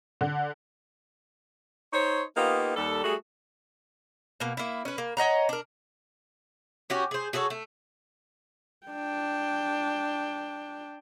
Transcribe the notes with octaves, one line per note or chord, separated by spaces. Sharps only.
D3
D#4 C5 C#5
A#3 B3 D#4 F4 G4
D#2 G3 A4
G3 A3 F#4 G#4
B2 A#3
A#3 E4
C#4 B4
A#3
C#5 D#5 F#5 A#5
D4 A#4
C#4 F#4 G4
G#4 C5
F#4 G#4 A4 C#5
A3
D4 G5